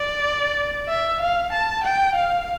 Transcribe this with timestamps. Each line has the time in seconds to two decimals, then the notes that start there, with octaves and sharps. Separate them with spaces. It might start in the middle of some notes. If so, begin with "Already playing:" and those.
Already playing: D5
0.88 E5
1.21 F5
1.53 A5
1.84 G5
2.15 F5